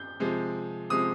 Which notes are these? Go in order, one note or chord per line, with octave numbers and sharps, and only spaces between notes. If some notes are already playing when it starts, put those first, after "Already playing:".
Already playing: G6
C3 F3 G#3
C3 F3 G#3 D#6